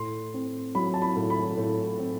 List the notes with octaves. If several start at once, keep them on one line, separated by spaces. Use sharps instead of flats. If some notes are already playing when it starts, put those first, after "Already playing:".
Already playing: A2 C6
C4
F#3 B5
A5
B5
A2
B5
A2
C4